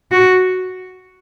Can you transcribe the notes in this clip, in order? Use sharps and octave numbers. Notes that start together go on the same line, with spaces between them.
F#4